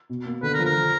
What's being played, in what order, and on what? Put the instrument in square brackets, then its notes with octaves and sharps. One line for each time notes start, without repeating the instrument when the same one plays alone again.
[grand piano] B2
A#3
[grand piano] D3 [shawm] B4
[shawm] A#4
[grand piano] F3
[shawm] A#4
[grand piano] F3